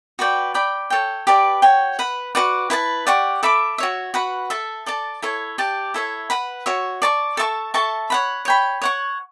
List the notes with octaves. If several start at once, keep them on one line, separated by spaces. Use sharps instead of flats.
F#4 B4 D5 G5
D5 G5 B5
A4 C#5 G5
G4 B4 D5 A5
F#4 C#5 G5
B4 F#5 B5
F#4 B4 D5 F#5
E4 B4 E5 A5
G4 D5 F#5 C#6
A4 E5 B5 D6
F#4 C#5 E5
F#4 B4 F#5 B5
A4 E5 A5
A4 D5 A5
E4 A4 C#5
G4 D5 A5
E4 A4 C#5 E5
B4 F#5 B5
F#4 C#5 E5
D5 A5 C#6
A4 E5 A5 C#6
A4 E5 A5 C#6
C#5 F#5 B5
C#5 G5 B5
C#5 F#5 C#6